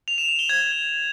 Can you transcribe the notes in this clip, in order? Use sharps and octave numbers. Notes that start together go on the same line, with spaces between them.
F7
E7
E7
G7
G#6